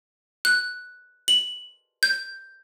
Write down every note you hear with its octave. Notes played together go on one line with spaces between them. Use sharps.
F#6
F#7
G6